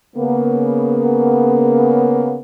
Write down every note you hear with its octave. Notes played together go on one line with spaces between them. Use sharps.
C#3 A#3 B3